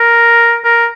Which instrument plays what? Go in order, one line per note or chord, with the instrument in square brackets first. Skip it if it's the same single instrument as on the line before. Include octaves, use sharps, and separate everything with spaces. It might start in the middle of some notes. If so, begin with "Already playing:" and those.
Already playing: [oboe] A#4
A#4